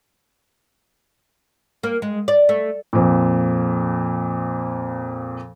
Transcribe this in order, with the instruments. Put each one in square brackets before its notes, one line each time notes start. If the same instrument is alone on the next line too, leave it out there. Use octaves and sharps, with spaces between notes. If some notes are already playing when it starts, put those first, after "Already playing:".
[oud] A#3
G#3
D5
A3
[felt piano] F2 A#2